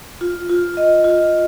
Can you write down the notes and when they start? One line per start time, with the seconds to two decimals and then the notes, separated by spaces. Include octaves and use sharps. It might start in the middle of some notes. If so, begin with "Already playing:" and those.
0.21 F4
0.49 F4
0.77 D#5
1.04 F4